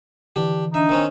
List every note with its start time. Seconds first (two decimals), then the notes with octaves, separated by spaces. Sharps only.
0.36 D3 E3 D4 G4
0.74 D4 D#4 E5
0.89 D#3 C4 C#4